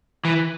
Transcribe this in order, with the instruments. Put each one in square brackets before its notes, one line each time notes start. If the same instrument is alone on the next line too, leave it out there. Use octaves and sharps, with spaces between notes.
[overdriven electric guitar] E3